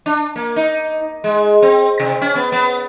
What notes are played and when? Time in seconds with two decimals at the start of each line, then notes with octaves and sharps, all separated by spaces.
0.06 D4
0.36 A#3
0.56 D#4
1.24 G#3
1.62 C4
2.00 C3
2.21 C#4
2.35 B3
2.52 B3